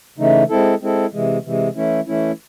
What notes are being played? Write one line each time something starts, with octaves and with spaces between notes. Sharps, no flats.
C#3 E3 A3 D#4
G#3 C4 E4 A4
G#3 C4 E4 A4
C3 E3 G#3
C3 E3 G#3
E3 A3 C#4 E4
E3 A3 C#4 E4